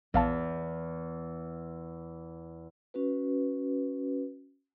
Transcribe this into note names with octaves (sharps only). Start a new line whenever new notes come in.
A#1 E2 F5 A5
C#4 F#4 B4